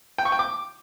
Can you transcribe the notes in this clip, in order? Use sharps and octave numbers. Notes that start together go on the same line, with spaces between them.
G5
C#6
G5
D6